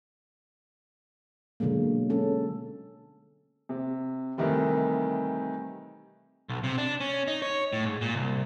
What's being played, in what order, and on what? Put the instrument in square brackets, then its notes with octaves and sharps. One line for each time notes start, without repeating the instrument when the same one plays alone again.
[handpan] B2 D3 F#3 G#3 A#3
G#3 C#4 A4
[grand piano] C3
C3 D#3 E3 G3 A3
[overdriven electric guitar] B1
C3
D4
C#4
D#4
C#5
A2
G#2
A#2
C2